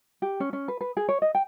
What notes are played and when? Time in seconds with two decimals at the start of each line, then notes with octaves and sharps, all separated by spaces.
0.22 G4
0.40 C#4
0.53 C#4
0.68 B4
0.81 B4
0.97 G#4
1.09 C#5
1.22 D#5
1.35 G5